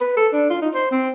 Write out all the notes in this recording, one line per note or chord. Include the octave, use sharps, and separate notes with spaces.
B4
A4
D4
F4
D#4
C5
C4